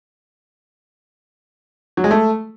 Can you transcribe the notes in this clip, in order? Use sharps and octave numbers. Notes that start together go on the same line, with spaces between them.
F#3
G#3
A3